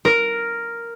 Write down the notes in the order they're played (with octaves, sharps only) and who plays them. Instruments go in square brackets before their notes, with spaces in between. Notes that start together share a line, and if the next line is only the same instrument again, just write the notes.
[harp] A#4